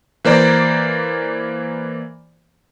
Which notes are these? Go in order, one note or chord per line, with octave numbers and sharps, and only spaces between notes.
E3 A#3 C5 D5 A#5